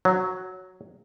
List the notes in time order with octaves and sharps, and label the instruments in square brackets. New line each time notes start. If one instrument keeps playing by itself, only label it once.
[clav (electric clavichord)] F#3